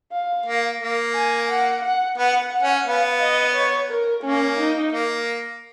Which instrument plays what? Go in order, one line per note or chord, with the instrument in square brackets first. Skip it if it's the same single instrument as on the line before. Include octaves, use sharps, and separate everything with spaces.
[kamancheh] F5
[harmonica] A#3
A#3
[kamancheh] G#5
F#5
F#5
[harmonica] B3 [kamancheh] F#5
[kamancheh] F#5
[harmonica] C#4
[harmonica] B3 [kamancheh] F5
[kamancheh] D#5
C#5
A#4
[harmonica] A#3 [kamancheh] C#4
[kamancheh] D#4
[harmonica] A#3